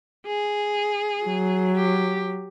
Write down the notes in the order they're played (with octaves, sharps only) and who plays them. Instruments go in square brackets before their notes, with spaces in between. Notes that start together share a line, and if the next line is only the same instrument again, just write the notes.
[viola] G#4
[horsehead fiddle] F#3
[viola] G4